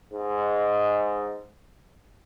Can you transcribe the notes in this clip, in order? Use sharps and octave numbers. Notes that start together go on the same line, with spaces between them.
G#2 G#3